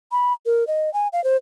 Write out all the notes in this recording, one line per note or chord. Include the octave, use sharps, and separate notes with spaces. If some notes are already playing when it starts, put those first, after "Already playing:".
B5
A#4
D#5
G#5
F5
C5